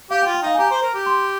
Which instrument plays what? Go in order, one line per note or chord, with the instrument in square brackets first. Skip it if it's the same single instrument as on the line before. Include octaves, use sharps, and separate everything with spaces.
[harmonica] G4 [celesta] F5
[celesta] G5
[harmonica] F4
[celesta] G5
[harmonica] D#4 [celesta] F5
[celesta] G#5
[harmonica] G4 [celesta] A#5
[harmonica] C5
A#4
G4
[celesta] C6